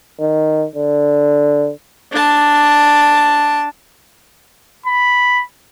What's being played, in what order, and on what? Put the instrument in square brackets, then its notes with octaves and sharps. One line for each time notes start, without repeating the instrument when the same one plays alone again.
[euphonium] D#3
D3
[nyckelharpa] D4 A5
[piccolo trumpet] B5